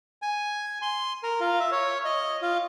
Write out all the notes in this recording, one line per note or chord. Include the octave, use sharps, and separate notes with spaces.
G#5
C6
A#4
F4
E5
C#5
D#5
F4